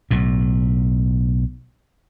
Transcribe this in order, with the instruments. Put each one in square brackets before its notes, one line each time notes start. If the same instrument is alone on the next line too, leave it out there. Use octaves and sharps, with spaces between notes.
[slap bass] B1 A2